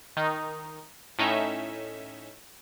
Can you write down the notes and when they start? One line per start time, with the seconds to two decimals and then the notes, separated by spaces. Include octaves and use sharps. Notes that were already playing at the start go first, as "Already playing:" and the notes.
0.17 D#3 D#4
1.19 A2 C#4 D#4 E5